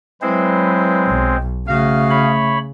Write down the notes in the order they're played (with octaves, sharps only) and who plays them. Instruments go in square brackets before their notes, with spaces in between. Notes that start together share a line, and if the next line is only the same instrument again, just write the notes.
[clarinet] F#3 [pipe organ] G#3 C4 C5 [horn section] E4 B4
[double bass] B1
[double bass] C#3 [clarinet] A3 [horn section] F#4 D#5 F5
[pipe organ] C#5 B5